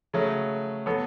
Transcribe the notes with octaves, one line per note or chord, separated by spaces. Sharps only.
C#3 F#3 A3
F#3 B3 A4